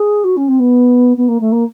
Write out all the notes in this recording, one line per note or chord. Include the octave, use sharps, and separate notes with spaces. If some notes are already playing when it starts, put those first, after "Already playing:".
Already playing: G#4
F#4
C#4
C4
B3
B3
A#3
A3
A#3